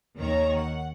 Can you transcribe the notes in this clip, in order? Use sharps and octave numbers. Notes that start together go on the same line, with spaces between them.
D#2 D#3 C#5 A#5
F#5